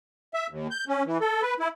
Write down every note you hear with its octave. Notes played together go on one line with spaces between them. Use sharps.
E5
D#2
G6
C#4
E3
A4
B4
E4